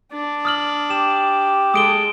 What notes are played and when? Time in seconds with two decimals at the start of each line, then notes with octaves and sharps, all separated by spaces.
0.11 D4 D5
0.45 D#6 F6 F#7
0.90 G4 E7
1.74 G#3 A4 D#6 D7 G7